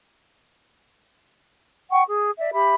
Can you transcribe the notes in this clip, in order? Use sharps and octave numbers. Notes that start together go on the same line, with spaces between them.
F#5 G5 C#6
G#4
D5 E5
G4 E5 B5